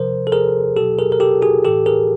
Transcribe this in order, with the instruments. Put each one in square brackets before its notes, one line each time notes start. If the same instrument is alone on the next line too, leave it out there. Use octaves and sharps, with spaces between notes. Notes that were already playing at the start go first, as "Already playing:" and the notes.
Already playing: [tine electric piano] C3 F3 A#4 C5
A4
G#4 A#4
B2 F#3 G4 A4
G#4 A#4
A#4
G4 A4
F#4 G#4
A2 E3 G4 A4
G#4 A#4